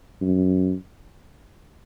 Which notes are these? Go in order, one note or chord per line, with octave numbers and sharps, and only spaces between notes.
F#2